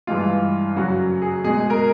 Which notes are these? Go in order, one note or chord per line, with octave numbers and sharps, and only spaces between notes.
G2 E3 G#3 F4
F#2 C#3 F#3 F#4
G#4
B2 G#3 G#4
A#4